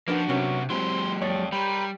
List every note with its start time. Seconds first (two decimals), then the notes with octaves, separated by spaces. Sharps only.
0.08 F3 A#3 C#4 D4 F#4 A#4 B4
0.29 C3 F#3 B3 C#4 A#4
0.70 F#3 G#3 A3 C4 E4 G4 C5 G#5
1.22 F2 C#5 D5
1.52 G3 A#4 B4 C#5 G5